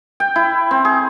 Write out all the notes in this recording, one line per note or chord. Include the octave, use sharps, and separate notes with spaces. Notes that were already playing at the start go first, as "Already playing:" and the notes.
G5
E4
C4
G#4